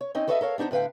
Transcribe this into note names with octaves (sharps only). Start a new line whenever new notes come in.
C#5
C4 C#4 D#4 D#5
F#4 A4 B4 C5 D#5 E5
A4 A#4 C#5 F5
B3 D4 D#4 G4 C5
A2 D3 B4 F5 G5